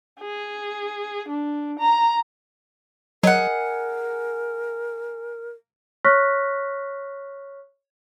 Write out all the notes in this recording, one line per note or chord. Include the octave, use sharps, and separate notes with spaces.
G#4
D4
A#5
F#3 G#4 A#4 D#5 F#5
C#5 C#6 F6 F#6 A#6 B6